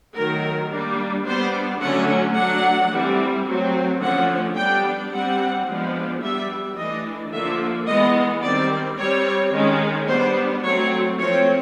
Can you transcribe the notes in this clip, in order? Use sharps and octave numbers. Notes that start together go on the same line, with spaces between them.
D#3 F#3 A3 A#4
G3 A#3 D4
G3 B3 D4 C5
D3 F#3 A3 C#4 F#5
F#3 A3 D4 F#5
E3 G3 C4
F#3 A3 C4
D3 F3 A3 C#4 F#5
G3 B3 D4 G5
G3 C4 F#5
F3 G#3 B3 D4
G3 B3 D4 E5
E3 A3 D4 D#5
D3 F3 A#3 D4 E5
E3 G#3 B3 D#5
D#3 G3 C4 D5
G3 C4 C#5
D#3 G#3 C#4
G3 B3 D4 C5
F#3 A3 C4 C#5
F3 A3 C4 C#5